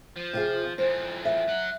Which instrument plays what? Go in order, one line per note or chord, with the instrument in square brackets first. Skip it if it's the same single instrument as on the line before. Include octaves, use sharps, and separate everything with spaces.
[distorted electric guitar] F3
[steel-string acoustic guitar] C3 F4 G#4
[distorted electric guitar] F2 E3 [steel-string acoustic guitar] C5
[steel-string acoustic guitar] E5
[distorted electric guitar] F#3 F#5